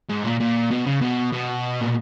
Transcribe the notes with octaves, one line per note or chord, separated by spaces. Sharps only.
G#2
A#2
A#2
B2
C#3
B2
B2
A#2